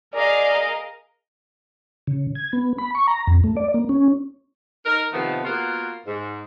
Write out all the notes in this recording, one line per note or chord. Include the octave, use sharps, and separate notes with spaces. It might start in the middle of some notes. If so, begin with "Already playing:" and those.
G#4 A#4 D5 D#5 F5
C#3
G#6
B3
B5
C#6
A#5
F2
A3
D5
A#3
C#4
D#4 A#4
C3 D#3 F3 A3 B3
A#3 B3 F4 F#4 A#4
G#2